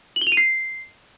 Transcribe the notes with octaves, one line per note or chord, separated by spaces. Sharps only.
F#7
G7
F7
D#7
C7